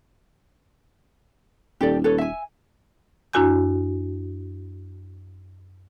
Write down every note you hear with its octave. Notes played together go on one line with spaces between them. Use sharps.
D#1 G4 A4 D5
A4 B4 C#5
E5 G#5
F#2 D4 E4 F#4 G#5 G6